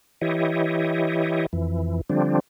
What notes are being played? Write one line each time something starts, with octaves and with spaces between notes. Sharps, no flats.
E3 E4 G4 C#5 D#5
F2 E3
D3 F3 G3 C4 D4